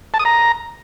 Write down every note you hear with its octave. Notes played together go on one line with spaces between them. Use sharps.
A5
D#6
A#5